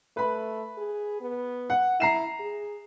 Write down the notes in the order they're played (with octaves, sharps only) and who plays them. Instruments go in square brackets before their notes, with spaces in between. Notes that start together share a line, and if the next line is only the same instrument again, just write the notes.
[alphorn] A3 [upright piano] B4 B5
[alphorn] G#4
B3
[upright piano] F#5
[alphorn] E4 [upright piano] A#5 C7 E7
[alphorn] G#4